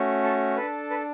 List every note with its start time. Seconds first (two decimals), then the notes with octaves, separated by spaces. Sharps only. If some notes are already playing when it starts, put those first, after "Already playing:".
Already playing: A3 C#4 F#4
0.24 A4
0.57 D4 A4 B4
0.90 B4